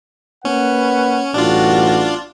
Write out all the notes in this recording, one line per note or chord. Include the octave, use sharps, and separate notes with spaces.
A#3 C#4 B4 F#5
A1 G3 D4 F4 F#4